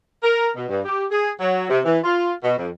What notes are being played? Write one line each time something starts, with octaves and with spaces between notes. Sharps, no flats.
A#4
B2
G2
G4
G#4
F#3
C3
E3
F4
B2
F2